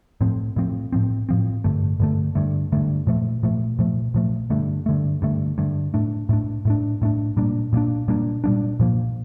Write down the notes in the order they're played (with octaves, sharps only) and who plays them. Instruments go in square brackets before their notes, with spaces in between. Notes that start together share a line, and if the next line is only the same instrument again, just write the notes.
[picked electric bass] A2 F3 C4
A2 F3 C4
A2 F3 C4
A2 F3 C4
G2 D3 A3
G2 D3 A3
G2 D3 A3
G2 D3 A3
A#2 F3 A3
A#2 F3 A3
A#2 F3 A3
A#2 F3 A3
G2 D3 A3
G2 D3 A3
G2 D3 A3
G2 D3 A3
A2 A3 D4
A2 A3 D4
A2 A3 D4
A2 A3 D4
A#2 G3 A#3 D4
A#2 G3 A#3 D4
A#2 G3 A#3 D4
A#2 G3 A#3 D4
A#2 F3 A#3